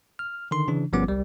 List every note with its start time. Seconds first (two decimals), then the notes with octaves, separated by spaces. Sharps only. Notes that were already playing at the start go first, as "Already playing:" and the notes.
0.19 F6
0.51 D3 D#3 C6
0.68 C#3 E3 D4
0.93 G1 F3 G3 B3 C#4 D6
1.08 C2 G3